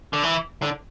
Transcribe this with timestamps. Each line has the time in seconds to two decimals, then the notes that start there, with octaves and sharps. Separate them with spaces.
0.13 D3
0.23 E3
0.62 D3